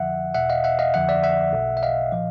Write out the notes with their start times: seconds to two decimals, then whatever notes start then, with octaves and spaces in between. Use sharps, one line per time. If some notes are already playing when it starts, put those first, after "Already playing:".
Already playing: F2 D3 F3 E5 F#5
0.34 E2 B2 E5 F#5
0.50 D#5 F5
0.64 E5 F#5
0.79 D#5 F5
0.94 F2 D3 F3 E5 F#5
1.09 D5 E5
1.24 E5 F#5
1.53 B1 B2
1.77 E5
1.83 D#5 F5
2.12 A#2 F3